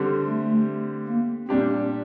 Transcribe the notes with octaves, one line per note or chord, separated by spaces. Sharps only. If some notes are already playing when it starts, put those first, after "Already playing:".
Already playing: D3 G3 C4 G4
A3
A#3
A#2 G3 C4 D4 G4